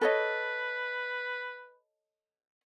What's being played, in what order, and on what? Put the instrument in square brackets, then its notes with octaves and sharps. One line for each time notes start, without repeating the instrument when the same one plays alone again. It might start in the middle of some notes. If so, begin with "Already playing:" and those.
[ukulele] A4 C#5 D#5 [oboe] B4